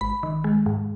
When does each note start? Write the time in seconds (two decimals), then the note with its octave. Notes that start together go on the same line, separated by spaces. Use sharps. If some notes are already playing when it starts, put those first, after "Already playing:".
0.01 G#1 B5
0.23 D#3
0.44 G#3
0.66 G#2